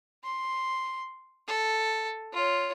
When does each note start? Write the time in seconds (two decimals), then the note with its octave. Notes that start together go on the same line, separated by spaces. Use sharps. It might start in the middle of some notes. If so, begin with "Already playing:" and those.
0.24 C6
1.48 A4
2.33 F4 C#5